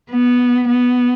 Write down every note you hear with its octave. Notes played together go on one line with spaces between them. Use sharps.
B3
B3